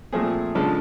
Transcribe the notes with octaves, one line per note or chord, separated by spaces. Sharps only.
A#2 F3 A3 C4 G#4
C#3 F3 G#3 B3 D4 A4